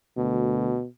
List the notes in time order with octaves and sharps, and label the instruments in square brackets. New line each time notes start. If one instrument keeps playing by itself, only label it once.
[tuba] D2 [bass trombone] B2